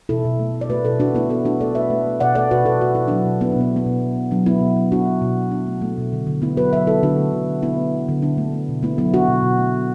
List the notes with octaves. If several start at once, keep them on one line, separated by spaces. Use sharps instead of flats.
B2 E4 A4
B2
A3
A3
D5
A3 F#4 B4
B2 E4 A4
B2 D4 F#4
A3 B3 E4
A3 E4 A4
A3 D4 F#4
A3 A4 D5
A3 B4 E5
A3
A3
B2 D5 F#5
A3 A4 D5
B2 F#4 B4
B2 E4 A4
A3 F#4
B2 E4
F#3 D4 F#4
B2
B2 B3 E4
D4
B2 B3
A3 B3
B2
F#3
B2
F#3 D4
A3 B3 E4
B2
F#3
B2 D4 F#4
B2
B2
B2
A3 D4
A3
A3
B2
D3
D3
A3 B3 E4
F#3 F#4 B4
F#3 B4 E5
D3 E4 A4
D3 D4 F#4
A3
D3
A3
D3 B3 E4
A3
A3
D3
D3 D4
A3
A3
B2
A3 B3 E4
F#3 B3 E4
F#3 D4 F#4
B2
B2
A3
F#3